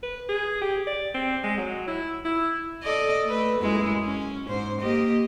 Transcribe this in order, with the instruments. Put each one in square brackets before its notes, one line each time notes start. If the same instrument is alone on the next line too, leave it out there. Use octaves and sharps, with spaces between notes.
[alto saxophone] B4
G#4
G4
D5
C4
G#3
F#3
E4
E4
[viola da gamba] A4 D5 D#5
A3 B4
F#2 G#3 E4
C#4
G#2 C5
A#3 G4 D#5